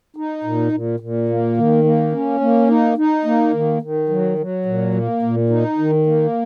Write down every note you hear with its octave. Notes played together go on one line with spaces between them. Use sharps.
D#4
A#2
A#2
A#2
A#3
D#3
A#3
C#4
A#3
D#4
D#4
A#3
D#3
D#3
F#3
F#3
A#2
A#3
A#2
D#4
D#3
A#3